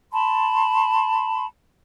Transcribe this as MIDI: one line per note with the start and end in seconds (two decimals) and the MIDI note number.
0.11 1.45 81
0.11 1.45 83
0.11 1.45 84